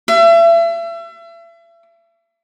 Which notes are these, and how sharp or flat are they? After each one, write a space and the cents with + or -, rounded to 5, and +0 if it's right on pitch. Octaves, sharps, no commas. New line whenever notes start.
E5 +35